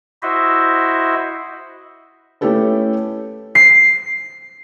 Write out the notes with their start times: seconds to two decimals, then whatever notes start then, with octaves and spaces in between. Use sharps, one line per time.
0.23 E4 F#4 C5 D#5 E5
2.41 A3 C#4 E4 G4 A4 B4
3.55 C7